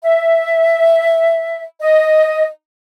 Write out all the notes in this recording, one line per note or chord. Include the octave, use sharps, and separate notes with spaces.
E5
D#5